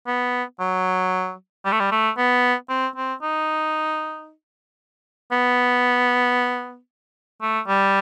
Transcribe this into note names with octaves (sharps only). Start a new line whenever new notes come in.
B3
F#3
G3
A3
G3
A3
B3
C4
C4
D#4
B3
A3
G3